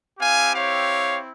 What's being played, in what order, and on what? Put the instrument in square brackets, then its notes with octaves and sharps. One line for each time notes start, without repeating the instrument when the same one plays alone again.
[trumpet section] C4 E4 G4 F5 G#5
C#5 F5